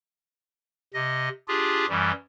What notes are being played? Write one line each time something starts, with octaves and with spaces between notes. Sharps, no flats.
C3 D#5
D4 F4 G4 G#4
F#2 E3 G3